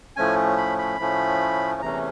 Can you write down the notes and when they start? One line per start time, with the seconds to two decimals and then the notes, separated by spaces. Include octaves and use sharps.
0.16 A2 F3 A3 C#4 G#5
0.57 B5
0.78 B5
0.99 A2 F3 A3 C#4
1.81 E2 C3 E3 A3 C#4 A#5